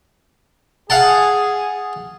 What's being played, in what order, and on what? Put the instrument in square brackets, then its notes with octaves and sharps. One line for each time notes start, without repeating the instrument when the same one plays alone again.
[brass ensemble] G#4 [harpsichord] F5 F#5 A5